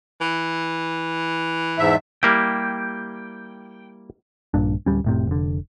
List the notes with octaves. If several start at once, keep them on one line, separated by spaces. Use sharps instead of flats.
E3
E2 G#2 E5
G3 A#3 E4 G5
A#1 G2 A#2 D4
D1 G1 G3 C#4
F1 A2 C3
F1 D3